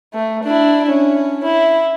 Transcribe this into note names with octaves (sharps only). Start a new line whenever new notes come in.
A3
D4 E4
C#4
E4